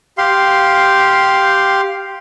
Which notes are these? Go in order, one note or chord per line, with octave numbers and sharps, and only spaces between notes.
G4 F5 C6